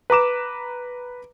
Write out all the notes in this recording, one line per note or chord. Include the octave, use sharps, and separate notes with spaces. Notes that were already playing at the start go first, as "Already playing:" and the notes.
B4 A#5 D6 E7